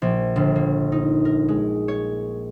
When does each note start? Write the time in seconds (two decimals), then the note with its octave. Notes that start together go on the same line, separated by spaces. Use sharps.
0.02 A#1
0.36 G1
0.56 A#3
0.92 D#4
1.25 A#4
1.48 G#3
1.88 C#5